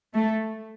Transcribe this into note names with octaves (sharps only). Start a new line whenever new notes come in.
A3